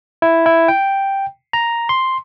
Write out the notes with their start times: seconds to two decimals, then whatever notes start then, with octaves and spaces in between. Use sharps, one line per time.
0.22 E4
0.46 E4
0.68 G5
1.53 A#5
1.89 C6